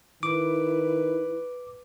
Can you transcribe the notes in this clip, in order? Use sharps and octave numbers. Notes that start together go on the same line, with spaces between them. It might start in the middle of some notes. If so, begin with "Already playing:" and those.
D#3 E4 B4 D6